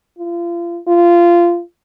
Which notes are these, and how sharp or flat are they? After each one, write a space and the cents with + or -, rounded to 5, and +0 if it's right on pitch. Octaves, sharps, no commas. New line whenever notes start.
F4 -30
F4 -15